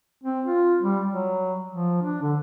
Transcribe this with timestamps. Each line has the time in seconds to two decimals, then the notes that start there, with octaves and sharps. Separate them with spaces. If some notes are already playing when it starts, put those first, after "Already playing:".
0.24 C4
0.45 F4
0.82 G3
1.09 F#3
1.71 F3
2.02 D4
2.22 D3